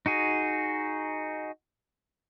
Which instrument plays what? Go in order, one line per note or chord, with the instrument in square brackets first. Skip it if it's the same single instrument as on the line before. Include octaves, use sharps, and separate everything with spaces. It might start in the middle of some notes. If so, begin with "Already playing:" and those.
[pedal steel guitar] D#4 F#4 G#4